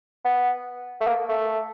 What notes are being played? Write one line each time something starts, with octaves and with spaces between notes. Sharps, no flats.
B3
A3
A#3
A3